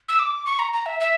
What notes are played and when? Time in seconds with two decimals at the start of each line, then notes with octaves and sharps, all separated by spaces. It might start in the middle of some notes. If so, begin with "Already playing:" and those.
0.09 E6
0.19 D6
0.46 C#6
0.59 A#5
0.73 A#5
0.86 E5
1.00 E5